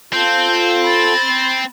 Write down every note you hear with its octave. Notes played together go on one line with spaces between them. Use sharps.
C4 F4 A4 G6
B5 A6